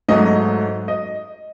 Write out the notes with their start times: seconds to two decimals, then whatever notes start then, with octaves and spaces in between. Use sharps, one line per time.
0.08 G#2 F#3 A3 D#5
0.88 D#5